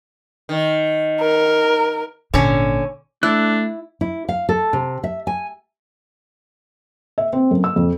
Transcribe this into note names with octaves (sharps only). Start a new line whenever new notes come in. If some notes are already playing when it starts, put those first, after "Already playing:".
D#3
A#4
G#1 A#2 D3 C#4
A3 D4 E4 F#6
E4
F5
A4
C3
E5
G#5
E5
C4
F#2
E6
F2